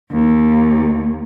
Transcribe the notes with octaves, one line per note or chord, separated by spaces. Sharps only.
D#2